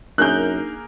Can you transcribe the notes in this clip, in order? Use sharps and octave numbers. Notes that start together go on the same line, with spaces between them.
F#2 A#3 D4 D#4 G#4 A#4 F#6 G6